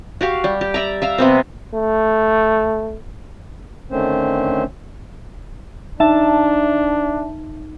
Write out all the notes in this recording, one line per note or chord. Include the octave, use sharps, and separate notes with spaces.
F#4 G4 F5
G3
G4
D5 E5 A#5
E5 F5 A#5
C3 B3 C4
A3
D3 D#3 A3 C4 C#4 C5
D4 D#4 E5 A5